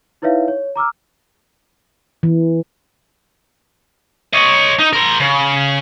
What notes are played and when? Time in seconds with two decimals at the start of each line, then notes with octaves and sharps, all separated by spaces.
0.22 D#4 E4 B4 C#5 E5 F5
0.48 C#5
0.76 A#5 D6 E6 F6
2.23 E3
4.33 C#5 D#5
4.79 D#4
4.93 A#4 C5
5.20 C#3